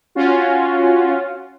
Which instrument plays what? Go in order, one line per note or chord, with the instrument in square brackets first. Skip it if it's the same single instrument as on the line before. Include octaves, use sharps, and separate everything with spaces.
[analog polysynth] C#4 F4 F#4